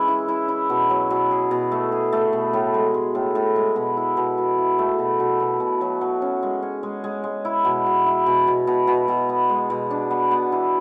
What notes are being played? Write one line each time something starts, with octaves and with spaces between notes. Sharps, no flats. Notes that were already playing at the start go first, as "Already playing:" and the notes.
Already playing: E3 G#3 C#4
E4
E4
E4
B2
F#3
B2
G#4
B2
A3
G#4
A3
B2
A2
G#3
G#3
A2
A2
G#3
B2
E4
B2
B2
E4
A3
B2
B2
B2
B2
F#3
F#3
C#4
G#3
C#4
G#3
G#3
G#3
E4
B2
B2
E4
B2
B2
B2
B2
B2
B3
G#3
B2
D4
B3
B3
E3